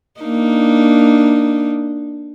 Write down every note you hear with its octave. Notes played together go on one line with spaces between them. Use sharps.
A#3 D4 D#4